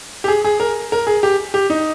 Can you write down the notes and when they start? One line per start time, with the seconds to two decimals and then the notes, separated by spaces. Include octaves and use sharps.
0.24 G4
0.28 G#4
0.44 G#4
0.60 A#4
0.92 A#4
1.07 G#4
1.23 G4
1.54 G4
1.70 D#4